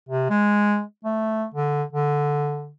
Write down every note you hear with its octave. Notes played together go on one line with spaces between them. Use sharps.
C3
G#3
A3
D3
D3